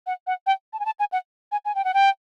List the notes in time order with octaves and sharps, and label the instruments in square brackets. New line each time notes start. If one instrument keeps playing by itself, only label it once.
[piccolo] F#5
F#5
G5
A5
G#5
A5
G#5
F#5
G#5
G#5
G5
F#5
G5